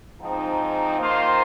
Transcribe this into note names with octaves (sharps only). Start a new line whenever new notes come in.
G#2 F3 C4 D#4
D#3 A#3 F4 C5